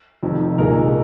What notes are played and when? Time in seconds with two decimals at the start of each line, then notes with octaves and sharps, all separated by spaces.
0.23 F1 F2 D#3
0.58 C2 A#2 G#3 D#4 A#4